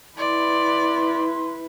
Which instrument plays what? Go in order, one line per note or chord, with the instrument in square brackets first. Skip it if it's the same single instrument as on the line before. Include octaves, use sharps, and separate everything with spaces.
[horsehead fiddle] E4 B4 [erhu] D5 [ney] C6